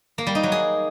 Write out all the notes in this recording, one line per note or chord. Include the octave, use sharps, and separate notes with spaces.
A#3
G3
D#4
F#3
G#4